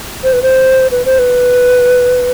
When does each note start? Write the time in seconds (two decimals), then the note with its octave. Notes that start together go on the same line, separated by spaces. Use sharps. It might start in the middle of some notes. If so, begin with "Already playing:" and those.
0.23 C5
0.33 B4
0.42 C5
0.91 B4
1.05 C5
1.19 B4